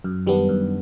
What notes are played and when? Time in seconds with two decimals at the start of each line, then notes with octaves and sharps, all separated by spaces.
0.04 F#2
0.27 D#3 G3 B3 D4
0.49 F#2